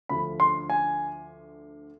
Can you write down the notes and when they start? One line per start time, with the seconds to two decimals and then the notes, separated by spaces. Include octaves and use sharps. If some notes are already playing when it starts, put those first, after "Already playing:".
0.09 D2 D3 F3 B5
0.40 C6
0.70 G#5